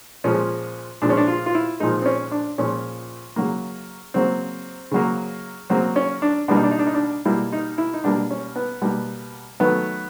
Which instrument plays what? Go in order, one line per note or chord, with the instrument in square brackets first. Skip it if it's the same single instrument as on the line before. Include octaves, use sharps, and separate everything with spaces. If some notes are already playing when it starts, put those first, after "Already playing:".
[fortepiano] A#2 F3 G#3 C#4
A#2 F3 G#3 D4
C#4
D4
F4
F4
E4
A#2 F3 G#3 D#4
C4
C#4
D4
A#2 F3 G#3 C#4
C#3 F#3 A#3
C#3 F#3 A#3 C4
C#3 F#3 A#3
C#3 F#3 A#3 C4
C#4
D4
B2 G3 A#3 D4
D#4
D4
D#4
D4
D#4
D4
B2 G3 A#3 E4
D#4
E4
D#4
B2 G3 A#3 D4
C#4
B3
B2 G3 A#3
D#3 F#3 A3 B3